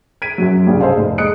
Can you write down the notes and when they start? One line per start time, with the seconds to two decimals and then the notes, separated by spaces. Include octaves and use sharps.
0.22 G#6 B6 D7 D#7
0.38 F#2 F#3
0.66 C2 G2 C#3 G3 A#3
0.81 G#4 A4 C5 D#5 F5
0.97 F1
1.18 G#3 D#5 D#6 F#6 C#7 D7